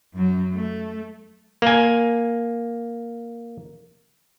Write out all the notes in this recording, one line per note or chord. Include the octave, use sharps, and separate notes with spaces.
F#2 F#3
A3
A#3 G#5